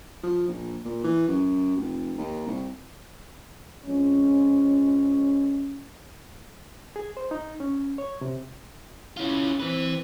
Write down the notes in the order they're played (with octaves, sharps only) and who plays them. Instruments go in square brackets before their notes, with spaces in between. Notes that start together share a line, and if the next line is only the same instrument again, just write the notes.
[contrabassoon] F3
A#1
A#2
E3
F#2
F1
D#2
C2
[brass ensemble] F2 G#3 C#4
[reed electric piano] G#4
C5
D#4
C#4
C#5
C3
[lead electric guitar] C#4 F4 [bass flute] E4
[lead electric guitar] E3 B4 [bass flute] C4